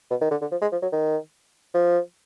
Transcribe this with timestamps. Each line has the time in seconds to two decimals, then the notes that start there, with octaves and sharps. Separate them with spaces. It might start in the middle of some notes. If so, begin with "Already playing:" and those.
0.10 B2
0.21 D#3
0.31 D3
0.41 D3
0.52 F3
0.62 G#3
0.72 F3
0.82 F#3
0.93 D#3
1.74 F3